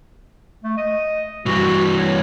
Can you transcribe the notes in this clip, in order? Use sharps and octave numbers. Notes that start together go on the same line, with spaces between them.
A3
D#5
G2 E3 F#4
C#5